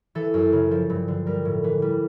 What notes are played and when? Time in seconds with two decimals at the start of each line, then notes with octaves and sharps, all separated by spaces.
0.15 E3 A4
0.34 F#2
0.53 C#3
0.71 F3
0.90 G2
1.08 D3
1.26 G3 A#4
1.45 A2
1.64 E3
1.82 G3